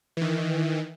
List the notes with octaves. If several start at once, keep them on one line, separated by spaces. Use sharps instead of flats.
D#3 E3